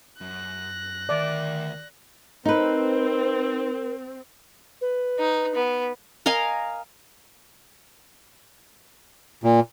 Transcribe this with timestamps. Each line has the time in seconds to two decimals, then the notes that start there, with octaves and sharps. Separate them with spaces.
0.21 F#2 F#6 A#6
1.09 D2 D#3 D5 E5
2.46 C4 D#4 A#4 B4
4.81 B4
5.19 D#4
5.55 B3
6.26 A#4 D#5 F5 G#5
9.44 A#2